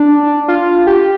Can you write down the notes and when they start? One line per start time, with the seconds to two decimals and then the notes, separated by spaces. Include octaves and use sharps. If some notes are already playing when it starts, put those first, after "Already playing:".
Already playing: D4
0.48 F4
0.87 G4